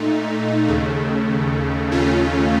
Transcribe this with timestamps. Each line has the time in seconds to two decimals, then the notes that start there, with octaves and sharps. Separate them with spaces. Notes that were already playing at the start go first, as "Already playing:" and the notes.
Already playing: A#2 A3 D#4
0.68 D#2 C#3 A3
1.91 D#2 C#3 A3 C#4 F4